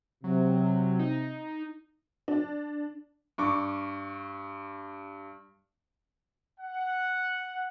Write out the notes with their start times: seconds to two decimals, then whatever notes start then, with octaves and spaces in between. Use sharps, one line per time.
0.24 C3 F#3
0.99 D#4
2.28 D4
3.38 G2 C#6 D6
6.60 F#5